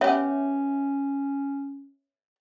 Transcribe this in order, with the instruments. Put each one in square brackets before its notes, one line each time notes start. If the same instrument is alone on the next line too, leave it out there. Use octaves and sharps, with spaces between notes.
[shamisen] B3 G4 [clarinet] C#4 [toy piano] C#5 E5